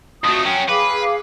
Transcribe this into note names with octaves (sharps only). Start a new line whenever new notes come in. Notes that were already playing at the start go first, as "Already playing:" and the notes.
F2 A3 F#4 D#6
F#3 C#4 G5
G#4 B4 F5 D6